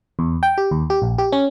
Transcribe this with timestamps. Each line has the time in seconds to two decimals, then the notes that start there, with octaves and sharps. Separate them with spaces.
0.19 E2
0.43 G5
0.58 G4
0.71 D#2
0.90 G4
1.02 A#1
1.18 G4
1.32 C#4